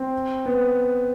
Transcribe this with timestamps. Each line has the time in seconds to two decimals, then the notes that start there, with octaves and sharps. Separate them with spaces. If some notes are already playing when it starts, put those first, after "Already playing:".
Already playing: C4
0.45 B3